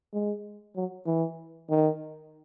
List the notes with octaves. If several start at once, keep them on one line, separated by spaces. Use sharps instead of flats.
G#3
F#3
E3
D#3